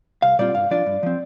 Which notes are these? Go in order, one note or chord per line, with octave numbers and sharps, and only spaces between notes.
C2 F5
A#2 G3 C4 F4 D5
G2 F5
F3 D4 F4 D5
G2
F3 C4